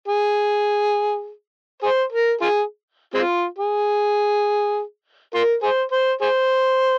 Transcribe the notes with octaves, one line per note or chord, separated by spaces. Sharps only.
G#4
G#4 C5
A#4
F4 G#4
G#3 C4 F4
G#4
F4 A#4
G#4 C5
C5
G#4 C5